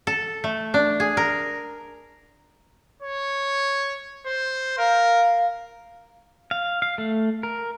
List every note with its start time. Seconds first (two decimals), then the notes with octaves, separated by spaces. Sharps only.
0.07 A4
0.44 A3
0.74 D4
1.00 G#4
1.17 A#4
3.02 C#5
4.26 C5
4.78 A#4 F5
6.51 F5
6.82 F5
6.98 A3
7.43 A#4